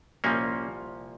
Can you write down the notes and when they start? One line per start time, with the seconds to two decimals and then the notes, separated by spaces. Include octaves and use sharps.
0.24 C2 A#2 F3 A#3 C#4